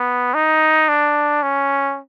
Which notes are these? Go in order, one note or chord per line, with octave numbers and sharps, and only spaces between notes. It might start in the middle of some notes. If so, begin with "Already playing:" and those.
Already playing: B3
D#4
D4
C#4